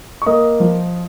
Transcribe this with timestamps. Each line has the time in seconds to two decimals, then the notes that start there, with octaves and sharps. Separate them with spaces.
0.22 C#6
0.26 A#3 D#5 D#6
0.60 F3